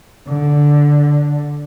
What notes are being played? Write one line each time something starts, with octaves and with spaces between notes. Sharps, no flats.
D3